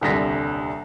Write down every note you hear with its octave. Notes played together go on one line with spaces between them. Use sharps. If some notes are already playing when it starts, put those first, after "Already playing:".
D#1 C2 D3 A#6 B6